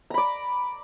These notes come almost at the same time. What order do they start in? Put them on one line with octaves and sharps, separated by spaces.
A#5 B5 D5